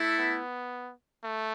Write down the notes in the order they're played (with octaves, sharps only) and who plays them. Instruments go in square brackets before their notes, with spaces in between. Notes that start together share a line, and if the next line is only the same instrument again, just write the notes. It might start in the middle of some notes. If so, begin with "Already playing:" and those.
Already playing: [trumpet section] A3 E4 A4 E5
[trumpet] B3
A3